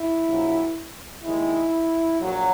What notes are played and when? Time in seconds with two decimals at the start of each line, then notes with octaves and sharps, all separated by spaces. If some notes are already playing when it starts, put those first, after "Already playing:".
Already playing: E4
0.27 A#1 A#2 F#3
1.23 D#2 D#3 G#3 E4
2.19 A#1 A#2 F#3